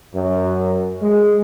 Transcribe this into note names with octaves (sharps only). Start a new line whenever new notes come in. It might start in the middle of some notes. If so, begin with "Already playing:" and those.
F#2
G#3